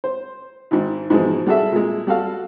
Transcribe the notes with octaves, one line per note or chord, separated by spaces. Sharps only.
C5
G#1 G#2
G#2 B2 E3 F3 G#3
G3 F#4 G#4 A4 E5
A#2 G#3
G3 F#4 A4 F5